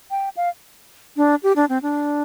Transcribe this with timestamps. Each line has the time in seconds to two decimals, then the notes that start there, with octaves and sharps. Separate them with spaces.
0.11 G5
0.37 F5
1.17 D4
1.43 G4
1.56 D4
1.69 C4
1.82 D4